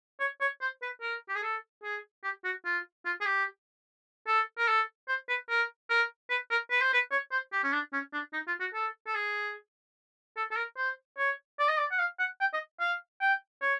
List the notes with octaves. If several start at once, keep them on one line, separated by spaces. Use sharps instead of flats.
C#5
C#5
C5
B4
A#4
G4
G#4
A4
G#4
G4
F#4
F4
F4
G#4
G4
A4
A#4
A4
C5
B4
A#4
A#4
B4
A#4
B4
C5
B4
C#5
C5
G4
C#4
D4
C#4
D4
D#4
F4
F#4
A4
A4
G#4
A4
A4
A#4
C5
C#5
D5
D#5
D5
F#5
F5
F#5
G5
D#5
F5
G5
C#5